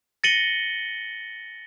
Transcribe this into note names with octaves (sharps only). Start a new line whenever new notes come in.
A6 A#6 C#7 D#7 F#7 G7